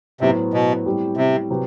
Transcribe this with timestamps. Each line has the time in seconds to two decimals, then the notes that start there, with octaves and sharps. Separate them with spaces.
0.21 A2 C3 F#3 B3 F#4 C5
0.54 B2
0.86 A2 G3 C4 G4
1.17 C3
1.50 C3 F#3 C4 G4 B4